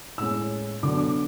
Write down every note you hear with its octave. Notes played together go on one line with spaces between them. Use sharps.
A2 G#3 C#4 E6
D3 F#3 B3 D4 D6
D6